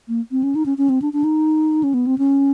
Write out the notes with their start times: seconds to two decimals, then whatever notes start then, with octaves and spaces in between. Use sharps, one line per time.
0.08 A#3
0.31 C4
0.43 C#4
0.55 D#4
0.66 C#4
0.78 C#4
0.89 C4
1.02 D4
1.13 D4
1.24 D#4
1.83 C#4
1.94 B3
2.07 C4
2.18 C#4